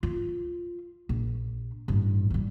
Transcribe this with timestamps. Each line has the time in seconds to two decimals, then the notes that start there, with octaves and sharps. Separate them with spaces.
0.03 F4
1.09 A#1
1.88 A1 G2
2.30 F#3 G3